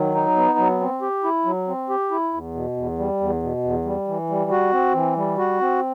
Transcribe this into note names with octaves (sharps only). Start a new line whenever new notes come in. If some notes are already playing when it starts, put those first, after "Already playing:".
Already playing: D#3 F#3
D#4
B3
F#3
C4
G4
E4
F#3
C4
G4
E4
E2
B2
E2
G3
E2
B2
E2
G3
E3
G3
F#4
C4
E3
G3
F#4
C4